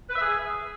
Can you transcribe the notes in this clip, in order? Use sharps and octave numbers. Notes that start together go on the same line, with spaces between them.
B4
E5
G#4